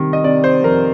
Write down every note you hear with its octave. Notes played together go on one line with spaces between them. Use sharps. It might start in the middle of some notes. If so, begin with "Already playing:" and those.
Already playing: C3 D#3 G3
D#5
C3 D5
C5
F2 A#4